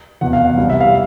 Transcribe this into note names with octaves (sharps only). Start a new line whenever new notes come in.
F1 E2 B2 F#5
F5
F#5
C2 B2 G3
E5
F5